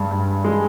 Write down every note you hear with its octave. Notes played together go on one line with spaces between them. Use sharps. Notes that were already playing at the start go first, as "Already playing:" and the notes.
Already playing: G2 G#3
G2
G#3